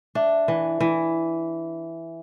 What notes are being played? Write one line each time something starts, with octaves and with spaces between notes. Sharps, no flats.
D4 E5
E3
E3